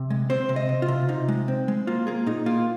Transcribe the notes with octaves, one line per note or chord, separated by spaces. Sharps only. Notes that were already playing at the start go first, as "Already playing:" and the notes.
Already playing: C3
G#3
C4 C5
C3
D#5
C3
F4
C3
C3 D#4
G#3
C4
G#3
A#3 F4
A#3 G#4
A#2 D#4
A#3 F4